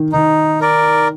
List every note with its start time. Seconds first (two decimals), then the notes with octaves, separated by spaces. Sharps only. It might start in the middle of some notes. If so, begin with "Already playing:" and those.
Already playing: D#3
0.12 D#3 D#4
0.61 A#4 D5